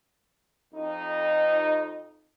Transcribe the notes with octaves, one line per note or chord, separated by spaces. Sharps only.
F2 D#4